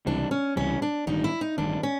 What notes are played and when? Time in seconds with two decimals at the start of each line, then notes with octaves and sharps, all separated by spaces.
0.06 C#2 C3 E3 G3 D4
0.31 C#4
0.56 C#2 C3 E3 G3 C#4
0.82 D4
1.07 A1 G2 D#3 D#4
1.24 E4
1.41 D#4
1.58 A1 G2 D#3 D4
1.83 C#4